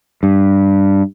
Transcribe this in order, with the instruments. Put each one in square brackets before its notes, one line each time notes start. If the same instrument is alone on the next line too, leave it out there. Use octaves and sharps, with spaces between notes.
[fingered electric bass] G2